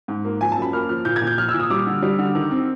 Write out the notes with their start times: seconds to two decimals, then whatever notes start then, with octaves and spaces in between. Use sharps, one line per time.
0.08 G#2
0.25 A#3
0.41 F3 G#5
0.52 F#2 A5
0.62 B5
0.73 A#3 F6
0.89 F3 F6
1.05 A#2 G6
1.16 G#6
1.22 A#2
1.27 G6
1.38 F3 F6
1.49 E6
1.54 A#2
1.59 D#6
1.70 G3 D6
1.87 D3
2.02 G3
2.19 D3
2.35 D#3
2.51 C4